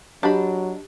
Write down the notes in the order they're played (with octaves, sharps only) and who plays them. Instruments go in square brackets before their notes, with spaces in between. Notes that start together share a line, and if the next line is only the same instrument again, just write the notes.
[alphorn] F#3 [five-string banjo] D4 D#5 B5 [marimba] G4